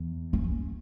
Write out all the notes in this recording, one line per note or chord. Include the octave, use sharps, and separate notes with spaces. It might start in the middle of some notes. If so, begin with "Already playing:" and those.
Already playing: E2
C#4